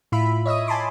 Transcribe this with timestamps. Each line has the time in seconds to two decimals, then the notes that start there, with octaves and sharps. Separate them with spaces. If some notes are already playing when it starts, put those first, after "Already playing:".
0.12 A2 E4 F4 E5 B5
0.45 C#5 D#5 E5 D#6
0.67 G#5 A5 B5 C6 D6